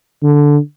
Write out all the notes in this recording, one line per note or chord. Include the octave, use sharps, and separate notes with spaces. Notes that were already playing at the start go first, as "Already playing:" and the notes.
D3